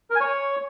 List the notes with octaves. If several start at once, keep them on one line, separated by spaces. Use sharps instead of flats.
A#4
G#5
C#5